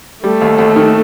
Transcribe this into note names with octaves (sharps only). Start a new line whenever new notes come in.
G3 A3
D#2
D#2
D#3